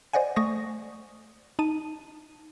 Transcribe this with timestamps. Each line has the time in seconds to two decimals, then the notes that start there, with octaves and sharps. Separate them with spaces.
0.13 C5 D5 D#5 F#5 G#5
0.36 A3 C#6 D#6 A#6
1.59 D#4 A5 D#7